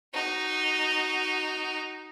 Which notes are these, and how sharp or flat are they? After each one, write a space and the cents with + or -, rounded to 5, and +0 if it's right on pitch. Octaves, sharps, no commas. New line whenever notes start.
D#4 -5 F#4 +15